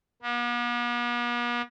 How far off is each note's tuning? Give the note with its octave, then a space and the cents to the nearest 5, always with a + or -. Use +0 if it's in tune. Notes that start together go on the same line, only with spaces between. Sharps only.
B3 -45